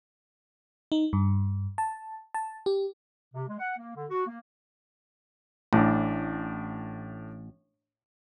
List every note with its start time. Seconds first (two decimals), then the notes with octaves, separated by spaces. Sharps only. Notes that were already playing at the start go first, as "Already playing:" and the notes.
0.92 D#4
1.13 G2
1.78 A5
2.34 A5
2.66 G4
3.34 C3
3.48 G#3
3.60 F#5
3.77 A#3
3.95 D3
4.10 F#4
4.27 A#3
5.73 A1 A2 D4